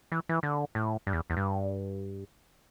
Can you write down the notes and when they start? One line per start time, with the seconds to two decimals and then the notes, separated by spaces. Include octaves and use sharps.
0.12 E3
0.29 E3
0.43 D3
0.75 A2
1.07 G2
1.13 E2
1.30 E2
1.37 G2